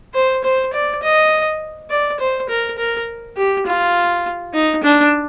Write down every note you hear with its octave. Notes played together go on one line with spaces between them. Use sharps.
C5
C5
D5
D#5
D5
C5
A#4
A#4
G4
F4
D#4
D4